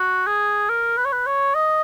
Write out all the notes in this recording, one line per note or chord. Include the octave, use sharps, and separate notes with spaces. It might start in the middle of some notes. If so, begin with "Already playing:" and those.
Already playing: F#4
G#4
A#4
B4
C#5
B4
C#5
D#5